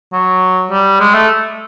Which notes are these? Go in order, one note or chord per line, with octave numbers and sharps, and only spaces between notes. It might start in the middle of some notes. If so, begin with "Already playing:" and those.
F#3
G3
G#3
A3